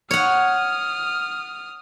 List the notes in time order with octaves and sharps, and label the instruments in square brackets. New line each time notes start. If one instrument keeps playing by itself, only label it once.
[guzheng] C#5 F#5 [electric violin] D#6 F6